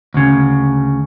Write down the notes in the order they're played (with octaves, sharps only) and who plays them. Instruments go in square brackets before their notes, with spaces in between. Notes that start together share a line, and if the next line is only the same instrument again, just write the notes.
[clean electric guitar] D2 C#3